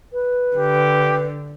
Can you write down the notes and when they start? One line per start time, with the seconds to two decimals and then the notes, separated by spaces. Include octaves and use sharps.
0.13 B4
0.56 D3 G4